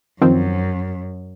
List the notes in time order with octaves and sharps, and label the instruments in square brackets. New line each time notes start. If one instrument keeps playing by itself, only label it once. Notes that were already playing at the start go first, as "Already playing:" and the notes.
[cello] F#2 [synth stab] D#3 F3 C4